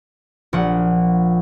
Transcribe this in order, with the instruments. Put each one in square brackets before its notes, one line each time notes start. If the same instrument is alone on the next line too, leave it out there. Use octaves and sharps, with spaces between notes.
[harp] A#1 F3 F#5